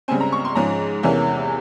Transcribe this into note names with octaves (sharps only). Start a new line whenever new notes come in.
C#2 C#3 G3 C4 G#5
A#5
C#6
C6
G#2 F3 G#3 C#4 A#5
E2 C3 E3 A#3 C#4